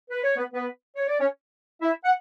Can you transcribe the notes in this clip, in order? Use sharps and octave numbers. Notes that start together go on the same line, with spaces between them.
B4
C#5
B3 B4
B3 B4
C#5
D5
C#4 C#5
E4 E5
F#5